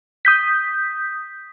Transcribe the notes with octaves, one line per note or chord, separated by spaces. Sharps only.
D#6 G6 B6